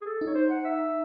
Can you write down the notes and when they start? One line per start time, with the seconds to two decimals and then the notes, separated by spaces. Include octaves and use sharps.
0.01 G#4
0.06 A4
0.21 D#4
0.27 C#5
0.35 C5
0.50 F#5
0.65 E5